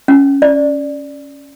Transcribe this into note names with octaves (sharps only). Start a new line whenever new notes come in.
C#4
D5